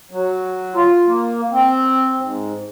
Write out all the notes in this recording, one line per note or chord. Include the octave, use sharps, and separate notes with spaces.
F#3
F4
A#3
C4
G#2